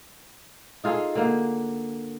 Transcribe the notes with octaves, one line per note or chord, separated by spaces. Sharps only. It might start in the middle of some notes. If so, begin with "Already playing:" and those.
D#4 F4 G#4 A4
D3 A#3